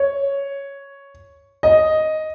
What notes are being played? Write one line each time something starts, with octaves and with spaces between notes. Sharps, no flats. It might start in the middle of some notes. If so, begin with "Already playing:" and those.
Already playing: C#5
D#5